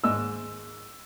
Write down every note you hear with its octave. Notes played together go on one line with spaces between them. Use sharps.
D#2 G#2 D#5 E6